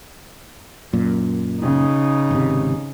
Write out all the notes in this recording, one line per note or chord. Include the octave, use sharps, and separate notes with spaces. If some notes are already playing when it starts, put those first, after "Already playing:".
F#2 A#2
C#3 D#4
G#1 C3